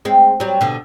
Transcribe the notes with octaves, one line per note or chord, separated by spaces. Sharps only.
G#3 C4
F#3 G3
B2 D3